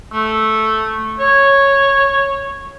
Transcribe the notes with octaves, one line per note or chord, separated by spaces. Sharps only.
A3
C#5